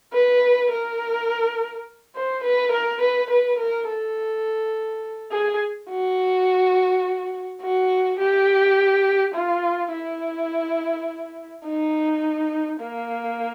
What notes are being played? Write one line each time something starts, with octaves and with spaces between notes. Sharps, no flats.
B4
A#4
C5
B4
A#4
B4
B4
A#4
A4
G#4
F#4
F#4
G4
F4
E4
D#4
A#3